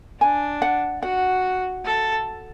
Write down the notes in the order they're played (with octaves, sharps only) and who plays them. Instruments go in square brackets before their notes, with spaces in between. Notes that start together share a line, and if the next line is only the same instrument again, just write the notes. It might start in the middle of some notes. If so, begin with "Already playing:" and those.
[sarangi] D4 [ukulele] G#5
[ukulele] F#5
[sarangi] F#4 [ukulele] F#5
[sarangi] A4